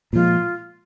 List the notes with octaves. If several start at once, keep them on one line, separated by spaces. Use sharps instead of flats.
A#2 F3 G#3 F4